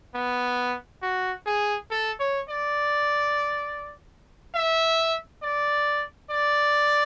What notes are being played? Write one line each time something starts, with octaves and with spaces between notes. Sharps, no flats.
B3
F#4
G#4
A4
C#5
D5
E5
D5
D5